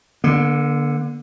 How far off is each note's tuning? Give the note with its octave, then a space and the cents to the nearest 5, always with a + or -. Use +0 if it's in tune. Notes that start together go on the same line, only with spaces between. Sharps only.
D3 +0 A#3 +45